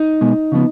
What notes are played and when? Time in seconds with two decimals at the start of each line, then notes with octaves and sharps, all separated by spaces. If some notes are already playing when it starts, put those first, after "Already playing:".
Already playing: D#4
0.21 B2 G#3 B3
0.52 C#3 F3 B3